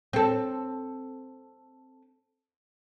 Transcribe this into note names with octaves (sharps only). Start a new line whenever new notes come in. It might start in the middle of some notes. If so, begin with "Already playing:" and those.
C4 A4